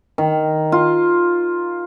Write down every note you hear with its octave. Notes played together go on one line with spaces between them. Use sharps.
D#3
F4